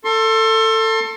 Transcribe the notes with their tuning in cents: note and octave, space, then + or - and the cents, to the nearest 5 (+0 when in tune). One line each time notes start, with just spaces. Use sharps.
A4 +20 C6 +35